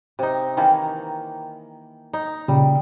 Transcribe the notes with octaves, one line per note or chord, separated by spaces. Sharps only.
C3 D#4
D#3 E3 A#3
D#4
A#2 C#3 G3